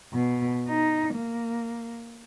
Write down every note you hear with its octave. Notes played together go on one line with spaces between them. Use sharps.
B2
D#4
A#3